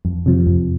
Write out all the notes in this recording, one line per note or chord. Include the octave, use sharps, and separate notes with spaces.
F2
C3 F3
F2